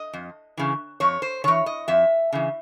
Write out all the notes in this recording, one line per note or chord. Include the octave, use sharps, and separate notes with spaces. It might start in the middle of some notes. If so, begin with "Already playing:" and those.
Already playing: D#5
F2
C#3 E3
F2 C#5
C5
C#3 E3 C#5
D#5
F2 E5
C#3 E3